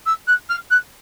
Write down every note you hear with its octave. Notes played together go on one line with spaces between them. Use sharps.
E6
F#6
F6
F#6